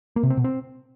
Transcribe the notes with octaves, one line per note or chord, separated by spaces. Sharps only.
A#3
C3
C4
B2
C4